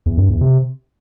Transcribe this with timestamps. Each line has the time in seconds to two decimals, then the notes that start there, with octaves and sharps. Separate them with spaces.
0.06 E2
0.18 G2
0.29 E2
0.41 C3